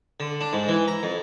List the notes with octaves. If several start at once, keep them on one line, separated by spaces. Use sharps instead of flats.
D3
D4
G#2
E3
A#5
F2